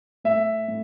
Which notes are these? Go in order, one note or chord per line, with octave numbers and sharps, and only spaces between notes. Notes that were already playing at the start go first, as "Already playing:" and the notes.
A2 E5
A2